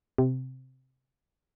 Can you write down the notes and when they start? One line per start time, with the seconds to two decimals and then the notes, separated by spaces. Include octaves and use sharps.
0.18 C3